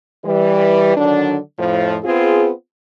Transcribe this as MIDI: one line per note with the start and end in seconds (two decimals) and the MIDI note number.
0.24 0.93 52
0.24 0.93 55
0.96 1.36 50
0.96 1.36 51
0.96 1.36 54
0.96 1.36 62
1.59 1.97 41
1.59 1.97 45
1.59 1.97 53
2.04 2.49 59
2.04 2.49 60
2.04 2.49 65
2.04 2.49 68